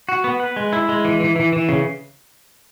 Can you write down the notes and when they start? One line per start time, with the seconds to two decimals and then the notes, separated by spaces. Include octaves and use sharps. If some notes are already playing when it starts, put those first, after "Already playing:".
0.09 F#4
0.24 B3
0.40 B4
0.56 G#3
0.73 E4
0.89 G#3
1.05 E3
1.20 E3
1.36 E3
1.53 E3
1.69 C#3